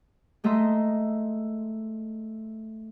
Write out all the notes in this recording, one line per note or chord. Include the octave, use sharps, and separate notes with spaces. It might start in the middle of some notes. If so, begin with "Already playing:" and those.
G#3 A3 D#5 E5 A#5 C6